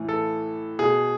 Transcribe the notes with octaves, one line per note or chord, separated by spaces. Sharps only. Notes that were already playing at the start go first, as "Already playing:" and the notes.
Already playing: A2 E3
A4
B2 G#4